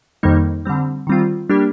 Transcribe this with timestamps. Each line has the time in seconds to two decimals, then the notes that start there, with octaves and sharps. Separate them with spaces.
0.23 F2 D#3 G3 A#3 D#4
0.65 D3 G3 C4
1.07 D#3 G3 C4 F4
1.50 G3 A#3 D4 G4